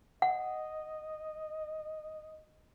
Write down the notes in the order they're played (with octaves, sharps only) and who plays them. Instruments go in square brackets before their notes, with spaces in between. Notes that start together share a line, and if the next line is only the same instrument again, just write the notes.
[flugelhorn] D#5 [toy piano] F#5